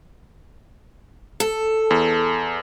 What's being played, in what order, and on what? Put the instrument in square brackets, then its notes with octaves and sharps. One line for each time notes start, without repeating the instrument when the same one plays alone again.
[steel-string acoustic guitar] A4
[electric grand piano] E2